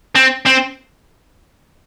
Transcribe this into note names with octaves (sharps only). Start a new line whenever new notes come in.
C4
C4